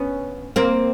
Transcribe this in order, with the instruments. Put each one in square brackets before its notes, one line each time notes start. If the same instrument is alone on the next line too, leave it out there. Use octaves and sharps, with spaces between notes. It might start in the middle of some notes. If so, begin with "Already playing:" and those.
Already playing: [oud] B3 C#4
A#3 C4